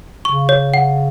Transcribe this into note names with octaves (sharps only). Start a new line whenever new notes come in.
C#3 C#6
C#5
F#5